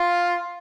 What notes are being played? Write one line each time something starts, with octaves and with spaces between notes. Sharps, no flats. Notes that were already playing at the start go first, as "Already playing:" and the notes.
Already playing: F4